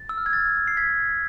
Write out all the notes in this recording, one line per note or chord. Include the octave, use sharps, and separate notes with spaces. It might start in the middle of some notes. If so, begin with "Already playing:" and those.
Already playing: A6
E6
F6
G#6
F6 A6
C7
G#6 B6